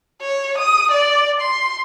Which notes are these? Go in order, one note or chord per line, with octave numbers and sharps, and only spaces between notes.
C#5
D#6
D5
C6